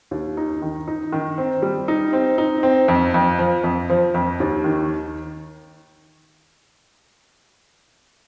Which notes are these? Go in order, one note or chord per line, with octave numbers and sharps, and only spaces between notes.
D#2
D#4
D#3
D#4
D#3
C4
G3
D#4
C4
D#4
C4
F2
F2
F3
F2
F3
F2
D#2
D#3